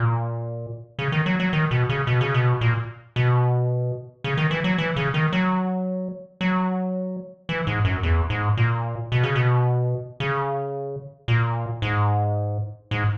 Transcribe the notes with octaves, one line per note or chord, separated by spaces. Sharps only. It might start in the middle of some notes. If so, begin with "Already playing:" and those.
Already playing: A#2
C#3
D#3
F#3
F#3
D#3
B2
C#3
B2
C#3
B2
A#2
B2
C#3
D#3
E3
F#3
E3
C#3
D#3
F#3
F#3
E3
G#2
F#2
E2
G#2
A#2
B2
C#3
B2
C#3
A#2
G#2
G#2